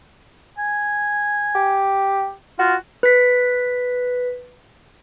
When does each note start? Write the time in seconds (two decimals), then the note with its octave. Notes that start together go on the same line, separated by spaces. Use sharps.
0.58 G#5
1.55 G4
2.59 F4 F#4
3.03 B4 B6